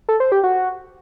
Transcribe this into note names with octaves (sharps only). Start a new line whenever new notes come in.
A4
C5
G4
F#4